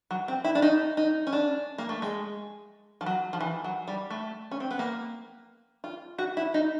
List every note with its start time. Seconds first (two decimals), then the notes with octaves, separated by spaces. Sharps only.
0.11 F#3
0.28 C4
0.44 E4
0.55 D4
0.62 D#4
0.97 D#4
1.27 C#4
1.33 D4
1.78 A#3
1.89 A3
2.02 G#3
3.01 F3
3.06 F#3
3.33 F3
3.40 E3
3.64 F#3
3.88 G3
4.10 A3
4.51 C#4
4.60 C4
4.71 B3
4.79 A#3
5.84 F4
6.18 F#4
6.37 E4
6.54 D#4